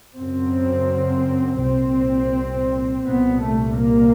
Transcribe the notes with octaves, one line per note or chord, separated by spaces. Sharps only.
F#2 C#3 C4
C2 A#2 C4
C2 A#2 B3
A3
A#3